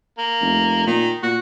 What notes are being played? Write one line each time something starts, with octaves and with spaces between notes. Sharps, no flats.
A#3
F1
A#2 D#3
A#2 F#4